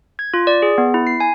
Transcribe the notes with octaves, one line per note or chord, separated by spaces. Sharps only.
G#6
F4
D5
G#4
B3
E4
C7
G#5